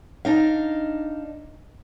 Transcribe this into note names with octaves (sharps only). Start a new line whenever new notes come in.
D4 D#4 F5